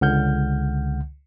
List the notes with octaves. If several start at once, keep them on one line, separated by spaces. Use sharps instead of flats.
C#2 D3 F#5 F6 G6